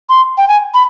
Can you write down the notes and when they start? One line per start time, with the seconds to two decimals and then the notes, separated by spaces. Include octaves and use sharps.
0.09 C6
0.38 G5
0.48 G#5
0.74 B5